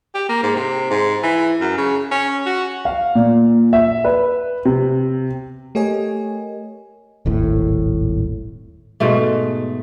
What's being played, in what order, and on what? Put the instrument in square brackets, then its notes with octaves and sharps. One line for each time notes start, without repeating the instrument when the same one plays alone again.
[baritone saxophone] G4
A#3
G#2
C3
G#2
E3
F#2
C#3
C#4
F#4
[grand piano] F5
A#2
E5
B4
C3
[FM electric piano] A3 G4 A#4 C#5 D#5 G#5
[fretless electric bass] D#1 G#1 A2
[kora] G#2 B2 A3